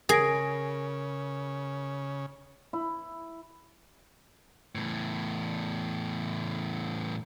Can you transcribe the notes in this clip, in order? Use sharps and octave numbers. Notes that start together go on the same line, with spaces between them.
C#3 G#4 A#4 A#6 D7
E4
E2 A2